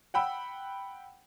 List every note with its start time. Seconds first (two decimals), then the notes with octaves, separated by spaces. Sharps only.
0.14 F#5 G5 B5 E6